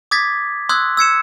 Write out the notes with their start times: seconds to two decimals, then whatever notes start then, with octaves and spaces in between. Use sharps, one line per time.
0.11 D6 D#6 G#6 A6 B6
0.69 C6 D#6 E6 F#6 G#6
0.97 E6 G#6 C#7 E7